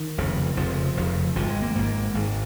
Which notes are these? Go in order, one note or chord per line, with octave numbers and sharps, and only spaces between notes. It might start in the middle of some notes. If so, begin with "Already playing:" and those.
Already playing: D#3
F1 F2 C#3
F1 F2 C#3 F3
F1 F2 C#3
G#1 G#2 F3
G#3
A#3
G#1 G#2 A#3
G#1 G#2